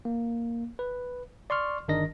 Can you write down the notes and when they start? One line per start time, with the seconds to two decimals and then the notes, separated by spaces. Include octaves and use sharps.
0.05 A#3
0.79 B4
1.50 D5 C6 C#6 F6
1.88 G1 D#3 D4 A#4 D#5 A#6